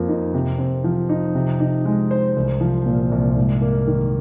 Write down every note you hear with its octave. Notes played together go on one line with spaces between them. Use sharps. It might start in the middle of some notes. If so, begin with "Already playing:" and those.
Already playing: F2 F3 A#3
D#4
C3
C4
F3
D#4
C3
D#4
G#3
C5
C2
F3
A#2
C2
G#2
A#3
D#3